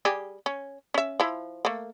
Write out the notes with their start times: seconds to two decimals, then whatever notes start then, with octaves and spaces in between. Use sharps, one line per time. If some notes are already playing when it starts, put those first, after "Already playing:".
0.05 G3 G4 G#4
0.46 C#4
0.94 C#4 E5
1.20 F3 E4
1.65 A3 A#3